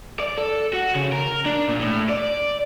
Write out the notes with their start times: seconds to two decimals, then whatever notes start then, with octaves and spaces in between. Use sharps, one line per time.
0.20 D5
0.38 A4
0.74 F#4
0.96 C#3
1.13 A#4
1.45 D4
1.68 A#2
1.80 A2
2.10 D5